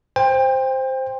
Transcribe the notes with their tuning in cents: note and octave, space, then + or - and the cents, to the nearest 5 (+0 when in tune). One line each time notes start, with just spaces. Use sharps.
C5 +0 G5 +30